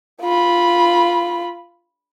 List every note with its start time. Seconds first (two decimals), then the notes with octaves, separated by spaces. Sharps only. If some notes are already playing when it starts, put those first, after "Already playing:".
0.22 F4 B5